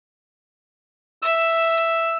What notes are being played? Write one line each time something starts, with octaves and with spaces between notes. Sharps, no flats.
E5 E6